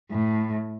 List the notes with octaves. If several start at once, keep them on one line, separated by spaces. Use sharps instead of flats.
A2